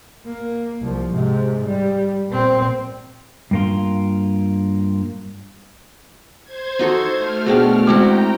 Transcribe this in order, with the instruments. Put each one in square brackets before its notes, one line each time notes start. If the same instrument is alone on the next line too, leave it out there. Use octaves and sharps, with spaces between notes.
[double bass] A#3
C2 F3
G#2 C3
G3
A#2 C4
[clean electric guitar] G2 A#3 F4
[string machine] C5 G#6
[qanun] D#4 F#4 A4
[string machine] A3 F6
[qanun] B2 D4 F#4 [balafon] G#4 C5 G5
[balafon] G#3 [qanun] C4 E4 F#4 [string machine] G5 A#5